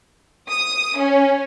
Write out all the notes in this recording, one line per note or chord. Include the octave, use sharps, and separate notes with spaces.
D#6
C#4